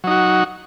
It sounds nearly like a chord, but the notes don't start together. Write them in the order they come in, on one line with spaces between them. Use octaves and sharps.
F#3 D#4 F#4